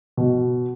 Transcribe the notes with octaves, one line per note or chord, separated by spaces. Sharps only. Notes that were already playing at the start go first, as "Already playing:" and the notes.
B2